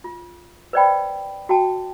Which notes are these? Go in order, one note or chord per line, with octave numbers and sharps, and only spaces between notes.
F4
B4 C5 D5 D#5 G5 B5
F#4 G5 A5